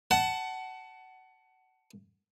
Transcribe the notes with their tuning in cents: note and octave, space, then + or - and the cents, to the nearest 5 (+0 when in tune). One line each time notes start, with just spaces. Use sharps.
F#5 +20 A5 -5